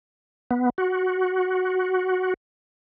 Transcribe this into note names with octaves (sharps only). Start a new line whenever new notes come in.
B3
F#4